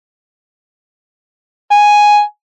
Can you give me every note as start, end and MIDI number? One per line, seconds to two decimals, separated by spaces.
1.71 2.21 80